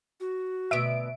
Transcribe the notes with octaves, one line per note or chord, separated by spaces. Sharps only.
F#4
D2 B2 E5 D7